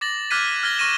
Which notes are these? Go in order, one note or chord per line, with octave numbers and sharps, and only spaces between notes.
D6 A6 A#6 F#7
D6 F6 F#6 G#6 B6 D#7
F6 F#6 G#6 A#6 G7
C#6 F6 A#6 D#7 E7